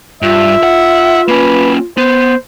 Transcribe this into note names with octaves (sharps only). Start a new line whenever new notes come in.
G2 F4 E5
F#5
A#3 C#4 B4
B3 C5